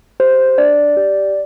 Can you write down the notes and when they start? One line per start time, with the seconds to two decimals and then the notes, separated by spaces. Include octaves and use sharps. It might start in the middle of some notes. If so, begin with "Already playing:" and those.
0.20 G4 C5
0.58 D4 D5
0.97 G4